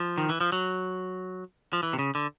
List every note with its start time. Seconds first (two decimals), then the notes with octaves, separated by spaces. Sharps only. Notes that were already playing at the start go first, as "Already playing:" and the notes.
Already playing: F3
0.18 D#3
0.29 E3
0.41 F3
0.52 F#3
1.73 F3
1.83 E3
1.93 C3
1.99 C#3
2.15 D3